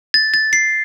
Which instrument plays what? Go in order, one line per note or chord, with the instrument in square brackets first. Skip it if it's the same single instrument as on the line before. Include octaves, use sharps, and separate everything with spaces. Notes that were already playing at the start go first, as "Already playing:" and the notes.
[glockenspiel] A6
A6
C7